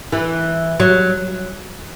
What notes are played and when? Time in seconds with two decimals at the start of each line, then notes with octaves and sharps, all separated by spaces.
0.12 E3
0.80 F#3